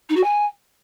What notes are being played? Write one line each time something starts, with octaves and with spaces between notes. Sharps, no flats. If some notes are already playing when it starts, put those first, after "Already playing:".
D#4
F#4
G#5